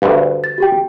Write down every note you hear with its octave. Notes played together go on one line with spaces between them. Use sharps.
D2 G2
A6
F#4 G4 G5